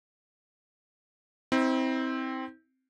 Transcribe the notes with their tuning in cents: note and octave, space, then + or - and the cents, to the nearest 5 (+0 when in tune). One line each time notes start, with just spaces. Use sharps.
C4 +0 E4 -45